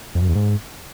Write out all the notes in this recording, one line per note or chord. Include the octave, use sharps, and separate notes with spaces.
F2
F#2
E2
G#2